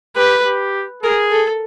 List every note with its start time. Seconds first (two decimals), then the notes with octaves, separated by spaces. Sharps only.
0.17 G4 B4
0.45 G4
1.03 G#4 A#4
1.31 A4